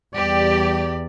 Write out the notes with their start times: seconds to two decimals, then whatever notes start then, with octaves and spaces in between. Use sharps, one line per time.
0.15 E2 G3 G4 D5